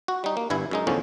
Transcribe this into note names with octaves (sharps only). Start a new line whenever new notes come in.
F#4
G3 D#4
A#3
G1 G2 E4 G#5
F#2 G#3 D#4
E2 A2 D3 F3 C#4